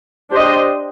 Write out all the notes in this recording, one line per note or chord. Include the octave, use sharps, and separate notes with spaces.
D4 G4 C5 D#5